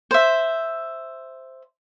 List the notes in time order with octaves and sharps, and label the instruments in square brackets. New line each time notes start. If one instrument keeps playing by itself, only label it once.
[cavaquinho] C5 E5